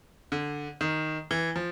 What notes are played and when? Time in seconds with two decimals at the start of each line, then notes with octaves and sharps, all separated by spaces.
0.32 D3
0.81 D#3
1.31 E3
1.56 F3